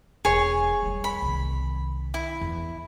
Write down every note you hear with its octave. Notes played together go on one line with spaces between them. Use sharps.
E1 G#4 C#5
F3 G3
B5
C2 D#3
E4
E2